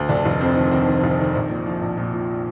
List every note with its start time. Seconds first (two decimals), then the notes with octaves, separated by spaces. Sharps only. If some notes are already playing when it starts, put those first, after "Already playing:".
Already playing: D2
0.09 F1 D3 D4
0.25 F1
0.40 F2 C4
0.57 D#3
0.71 D#3 C4
0.88 D#3
1.04 F1
1.19 D#3
1.35 A#1
1.50 A#2
1.66 F3
1.81 A#1
1.98 A#2
2.13 A#2